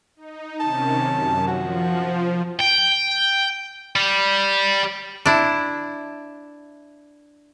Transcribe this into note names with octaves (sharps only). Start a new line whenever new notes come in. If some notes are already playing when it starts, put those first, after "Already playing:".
D#4
C3 D#3 C#4 A5
F#2
F3 F#4
G5
G3
D4 E4